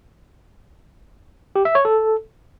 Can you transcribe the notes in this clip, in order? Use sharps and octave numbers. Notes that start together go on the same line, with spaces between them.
G4
E5
C#5
A4